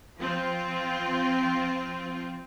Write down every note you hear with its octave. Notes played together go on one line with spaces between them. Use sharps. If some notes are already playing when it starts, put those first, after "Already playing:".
F3 C4 F4